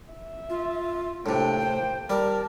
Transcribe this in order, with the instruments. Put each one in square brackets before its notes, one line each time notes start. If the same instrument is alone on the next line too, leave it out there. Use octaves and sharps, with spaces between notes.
[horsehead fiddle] E5
[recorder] F4
[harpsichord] A2 C3 [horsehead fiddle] A#3 G5 [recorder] D4
[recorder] C5
[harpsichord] G3 [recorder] A#4 [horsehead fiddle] A5